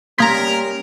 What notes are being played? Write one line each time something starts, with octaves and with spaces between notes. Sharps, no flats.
G3 A#3 C#4 A#4 A#5 C6 G#6 B6